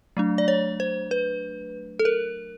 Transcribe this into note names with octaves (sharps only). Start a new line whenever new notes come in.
F#3 A3 D4
D5
C#5
C5
B4
A4
A#4